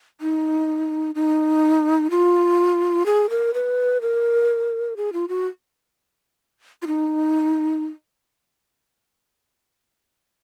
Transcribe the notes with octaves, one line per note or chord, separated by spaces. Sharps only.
D#4
D#4
F4
G#4
A#4
B4
A#4
G#4
F4
F#4
F4
D#4